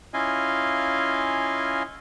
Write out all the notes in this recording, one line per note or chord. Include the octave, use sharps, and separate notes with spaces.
C#4 E4 F4 D#5 F5 G#5